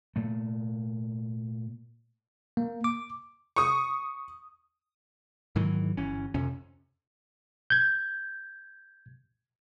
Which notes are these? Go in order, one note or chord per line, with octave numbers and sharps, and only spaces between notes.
A#2 A3
A#3
D6
C#6 D#6
G#2 D#3 E3 F#3
G1 E3 C#4
F2 C3 C#4
G6 G#6